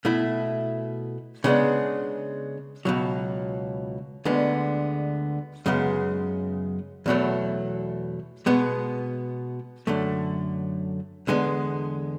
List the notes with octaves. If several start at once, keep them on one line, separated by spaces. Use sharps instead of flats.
B2 A3 E4
C#3 G#3 B3 D4
C#2 B2 F#3
D2 D3 G#3 B3
F#2 C#3 G#3 B3
E2 B2 F#3 A3
B2 G#3 B3
F#2 D3 A3
E2 D3 G#3 B3